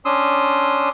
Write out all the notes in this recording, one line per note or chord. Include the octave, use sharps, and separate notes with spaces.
C#4 D4 C6 D#6 E6